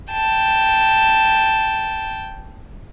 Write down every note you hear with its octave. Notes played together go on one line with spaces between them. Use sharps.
G5 A5